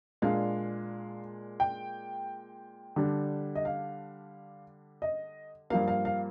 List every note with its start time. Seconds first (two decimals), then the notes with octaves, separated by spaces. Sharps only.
0.22 A#2 G#3 D4 F5
1.60 G5
2.96 D3 G3 D4
3.55 D#5
3.65 F5
5.02 D#5
5.70 G2 F3 A#3 F5
5.88 F5
6.05 F5